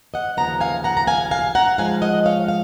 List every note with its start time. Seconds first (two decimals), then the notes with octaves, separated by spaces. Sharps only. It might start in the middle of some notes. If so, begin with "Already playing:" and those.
0.14 D#5 F#5
0.37 D#2 C#3 F3 B3 F#5 A#5
0.61 F5 G#5
0.84 F#5 A#5
0.97 A#5
1.07 F5 G#5
1.31 F5 G#5
1.55 F#5 A#5
1.78 G#2 F3 G#3 F5 G#5
2.02 D#5 F#5
2.25 C#5 F5
2.48 F5